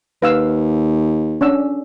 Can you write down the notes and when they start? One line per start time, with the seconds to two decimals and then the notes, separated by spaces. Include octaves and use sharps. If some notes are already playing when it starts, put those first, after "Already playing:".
0.22 D#2 B4 F5 E6
1.41 C#4 D4 E6